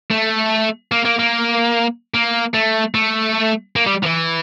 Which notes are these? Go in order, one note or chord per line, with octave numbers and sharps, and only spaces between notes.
A3
A#3
A#3
A#3
A#3
A3
A3
A#3
G3
F3
E3